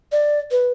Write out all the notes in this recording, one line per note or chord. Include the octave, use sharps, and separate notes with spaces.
D5
B4